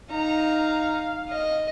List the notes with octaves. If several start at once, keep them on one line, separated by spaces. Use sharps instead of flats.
D#4 F5 A#5
D#5